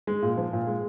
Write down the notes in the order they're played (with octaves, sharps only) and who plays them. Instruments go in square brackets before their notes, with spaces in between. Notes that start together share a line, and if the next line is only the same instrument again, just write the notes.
[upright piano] G#3
A#2
F3
A#2
G#3